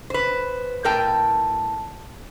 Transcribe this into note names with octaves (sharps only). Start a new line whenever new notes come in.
B4 C5
A2 A#4 G5 A5